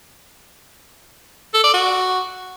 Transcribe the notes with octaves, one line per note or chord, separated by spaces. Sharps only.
A4
D5
F#4